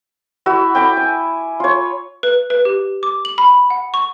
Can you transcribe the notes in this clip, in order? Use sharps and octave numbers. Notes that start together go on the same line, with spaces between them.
E4 F#4 E5
G5 B5 D6
G#5
F4 C#5
B4
B4
G4
D6
F#7
B5
F#5
C#6